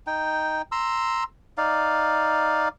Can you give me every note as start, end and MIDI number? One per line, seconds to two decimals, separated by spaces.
0.07 0.62 63
0.07 0.62 79
0.72 1.24 82
0.72 1.24 84
0.72 1.24 88
1.58 2.68 63
1.58 2.68 74
1.58 2.68 77